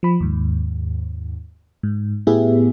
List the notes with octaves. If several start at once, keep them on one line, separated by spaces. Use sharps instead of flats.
F3 B5
D#2 G#2
G#2
A2 B3 E4 G4 G#4 E5